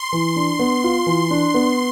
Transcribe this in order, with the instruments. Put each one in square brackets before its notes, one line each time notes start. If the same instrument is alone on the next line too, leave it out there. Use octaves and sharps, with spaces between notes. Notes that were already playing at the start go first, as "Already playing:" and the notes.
Already playing: [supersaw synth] C6
[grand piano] E3
D4
B3
F4
E3
D4
B3